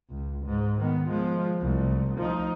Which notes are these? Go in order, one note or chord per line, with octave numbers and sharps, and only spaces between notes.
C#2
G#2
D#3 B3
F3 G#3
C2 A3
F3 D#4